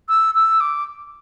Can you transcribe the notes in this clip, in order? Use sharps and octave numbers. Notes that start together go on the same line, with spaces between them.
E6
E6
D6